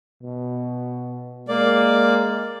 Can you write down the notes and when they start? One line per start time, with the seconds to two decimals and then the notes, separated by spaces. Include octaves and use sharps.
0.23 B2
1.48 G#3 A#3 D5